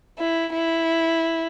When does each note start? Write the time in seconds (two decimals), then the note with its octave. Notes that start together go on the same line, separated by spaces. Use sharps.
0.19 E4
0.54 E4